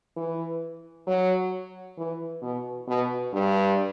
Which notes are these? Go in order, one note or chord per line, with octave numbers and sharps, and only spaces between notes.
E3
F#3
E3
B2
B2
G2